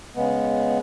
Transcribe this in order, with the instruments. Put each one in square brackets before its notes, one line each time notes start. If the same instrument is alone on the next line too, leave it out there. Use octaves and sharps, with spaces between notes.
[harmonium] C#3 G#3 B3